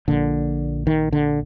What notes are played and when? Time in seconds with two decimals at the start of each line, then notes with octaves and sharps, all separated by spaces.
0.08 A#1 A#2 D3
0.87 D#3
1.12 D3